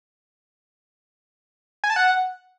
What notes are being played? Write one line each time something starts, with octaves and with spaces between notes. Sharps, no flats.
G#5
A5
F#5